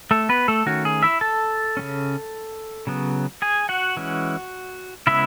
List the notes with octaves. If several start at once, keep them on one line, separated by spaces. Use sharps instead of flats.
A3 A4
B3 B4
A3 A4
D#3 A3 C#4 F#4
G#4
E4 E5
A4 A5
C#3 G#3 C#4
C#3 F#3 B3
G#4 G#5
F#4 F#5
E3 G#3 C#4
C#3 G#3 B3 E4 E5